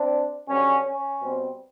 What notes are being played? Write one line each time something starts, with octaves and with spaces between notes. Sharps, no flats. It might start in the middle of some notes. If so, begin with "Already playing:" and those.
Already playing: C4 D4
G2 D3 F#3 C#4
C#4
B2 G3 C4